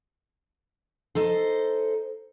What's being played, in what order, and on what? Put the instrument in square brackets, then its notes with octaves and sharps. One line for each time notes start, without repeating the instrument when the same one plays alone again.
[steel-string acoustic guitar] D#4 A4 C5